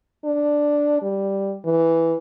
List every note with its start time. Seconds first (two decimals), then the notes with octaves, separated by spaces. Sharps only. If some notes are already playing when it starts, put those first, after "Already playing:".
0.24 D4
1.02 G3
1.65 E3